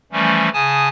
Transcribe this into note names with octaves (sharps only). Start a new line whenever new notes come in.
E3 F3 G3 A3 C#4
C#3 G#5 A5 D#6